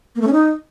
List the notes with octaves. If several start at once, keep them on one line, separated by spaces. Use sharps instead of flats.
A#3
A3
C#4
D#4